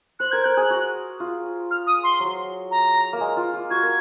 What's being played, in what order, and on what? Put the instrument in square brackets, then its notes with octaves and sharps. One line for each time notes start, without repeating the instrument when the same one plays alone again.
[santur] C5 [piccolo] F#6
[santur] A#4 [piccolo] G#6
[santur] A#4 [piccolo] F#6
[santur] G#4
F#4
F4
[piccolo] F6
D#6
C6
[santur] F#3
[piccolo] A#5
[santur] A#3
G#3
F4
F4
[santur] F#4 [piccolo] G#6
[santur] A#4